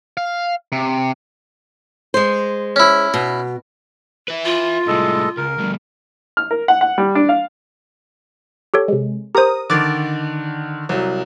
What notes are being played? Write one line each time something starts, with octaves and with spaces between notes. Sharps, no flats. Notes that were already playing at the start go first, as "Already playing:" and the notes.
F5
C3
G#3 C5
C#4 E4
B2
B4 E5
F4
C2 A2 G#3 A4 D#5
C#2 A#4
D2 G2
F6
A#4
F#5
F#5
G3
D4
F5
G4 A4 C#5
C3 G#3
G4 A#4 C5 A#5 D#6
D3 D#3 D6 A6
C2 F#3